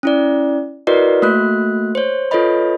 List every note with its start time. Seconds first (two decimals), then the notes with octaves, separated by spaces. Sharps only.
0.03 C#4 E4 D5
0.87 E4 F#4 A#4 B4 D5 D#5
1.22 A3 A#3 F#4 F#6
1.95 C5 C#5
2.31 F4 A4 B4 C#5 D#5 B5